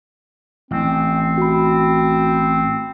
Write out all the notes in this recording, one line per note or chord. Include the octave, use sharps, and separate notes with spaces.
A1 C4
F#4 B5